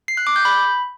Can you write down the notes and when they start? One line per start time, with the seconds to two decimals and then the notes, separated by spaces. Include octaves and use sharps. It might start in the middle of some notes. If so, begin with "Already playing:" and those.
0.08 C7
0.17 F#6
0.27 D6
0.36 G6
0.45 B5